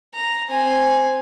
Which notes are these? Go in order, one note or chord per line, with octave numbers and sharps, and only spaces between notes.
A#5
C4 G#5